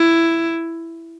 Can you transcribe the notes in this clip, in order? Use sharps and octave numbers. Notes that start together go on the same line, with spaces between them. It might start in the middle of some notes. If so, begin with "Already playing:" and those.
Already playing: E4